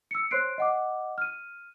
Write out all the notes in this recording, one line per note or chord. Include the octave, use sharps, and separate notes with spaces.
E6 C#7
C5 C#5 C6 F#6 C7 D7
D#5 F#5 D6
F6 D#7